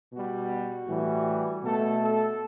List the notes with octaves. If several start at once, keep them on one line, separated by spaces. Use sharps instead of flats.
B2 G3 F#4
A2 E3 G3
B2 A3 A4
A4